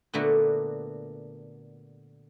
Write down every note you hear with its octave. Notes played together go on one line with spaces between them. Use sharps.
A#2 D3 A3 B3 F#4